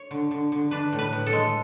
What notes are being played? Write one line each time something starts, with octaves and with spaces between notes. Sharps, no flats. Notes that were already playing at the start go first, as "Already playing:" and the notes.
Already playing: C#5
D3
D3
D3
D4 B4
A2
B4
A2
A4
G#3